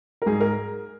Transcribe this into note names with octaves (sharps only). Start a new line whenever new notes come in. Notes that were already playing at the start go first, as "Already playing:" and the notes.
A#4
G#2 G#4
A#4